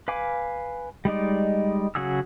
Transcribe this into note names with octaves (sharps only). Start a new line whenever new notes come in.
B4 F5 G#5 D6
G3 G#3 D#4 D5
C#3 F#3 F#4 G#4 E6